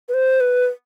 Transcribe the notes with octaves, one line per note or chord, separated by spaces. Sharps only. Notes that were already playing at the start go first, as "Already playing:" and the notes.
B4
C5
B4